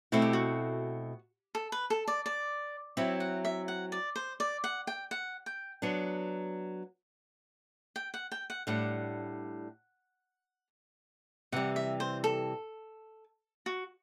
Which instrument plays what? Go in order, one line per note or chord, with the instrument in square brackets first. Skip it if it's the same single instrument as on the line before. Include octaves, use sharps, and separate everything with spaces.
[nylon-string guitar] B2 A3 C4 E4 [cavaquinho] F#4
[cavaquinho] G4
F#4
A4
B4
A4
D5
D5
[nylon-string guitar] F#3 C4 E4 [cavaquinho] E5
[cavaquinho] F#5
E5
F#5
D5
C5
D5
F#5
G5
F#5
G5
[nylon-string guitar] F#3 B3 D4
[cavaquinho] G5
F#5
G5
F#5
[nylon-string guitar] A2 G3 D4 [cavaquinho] F#5
[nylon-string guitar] C3 E3 G3 [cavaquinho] F#5
[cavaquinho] E5
C5
A4
F#4